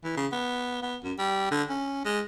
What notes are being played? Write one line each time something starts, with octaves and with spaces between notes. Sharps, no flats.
E3
C#3
B3
B3
F#2
G3
D3
C#4
G#3